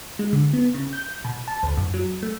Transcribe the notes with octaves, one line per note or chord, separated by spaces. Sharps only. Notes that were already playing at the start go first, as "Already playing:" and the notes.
G#3
D3
B3
C#3
G6
B2
A5
D2
F#2
F#3
A3